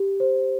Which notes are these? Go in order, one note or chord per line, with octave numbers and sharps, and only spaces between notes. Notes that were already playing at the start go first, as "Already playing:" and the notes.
Already playing: G4
C5